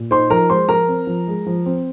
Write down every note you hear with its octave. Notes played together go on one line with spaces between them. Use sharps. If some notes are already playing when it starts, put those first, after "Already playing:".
Already playing: A#2
D#4 C5 C6
F3 A#4 A#5
G#3 C5 C6
F3 A#4 A#5
C4
F3
G#3
F3
C4